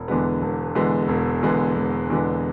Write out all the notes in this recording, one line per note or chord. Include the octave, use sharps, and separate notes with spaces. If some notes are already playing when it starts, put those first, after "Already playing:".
Already playing: E1
E2 D3 G#3 B3
E1
E2 D3 G#3 B3
E1
E2 D3 G#3 B3
E1
E2 D3 G#3 B3